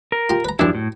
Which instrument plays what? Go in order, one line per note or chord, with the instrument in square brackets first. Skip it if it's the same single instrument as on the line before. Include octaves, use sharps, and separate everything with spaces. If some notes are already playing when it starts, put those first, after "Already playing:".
[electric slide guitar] A#4
[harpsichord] F4 G4
B4 A#5
[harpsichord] F#2 G3 [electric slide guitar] F3 D4 E4
[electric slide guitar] A2